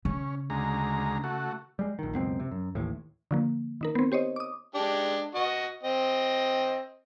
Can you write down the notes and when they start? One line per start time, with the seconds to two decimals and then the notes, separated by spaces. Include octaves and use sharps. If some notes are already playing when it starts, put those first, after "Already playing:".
0.05 C#3 C#4
0.50 D2 G#3 A#5
1.24 A3 F#4
1.79 G3 G#3
1.99 A#1 D#3
2.15 C#2 F#2 B2 C4
2.40 C3
2.51 F#2
2.75 A1 D#2 A2
3.31 D3 F3 A#3
3.81 D#3 D#4 A#4
3.95 B3 C4
4.12 G4 C5 C#5 D#5
4.36 D6 D#6
4.75 G#3 D4 G4
5.35 F#4 D#5
5.83 C4 D#5